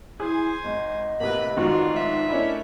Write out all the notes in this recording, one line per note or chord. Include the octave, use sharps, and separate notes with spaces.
E4 G#4 C5 G#5
G#1 D#5
A1 C3 A#3 B4 B5
F1 G#2 D#3 D4 F4 F#4
E5
A3 C#4 D4 E4 A#4 D#5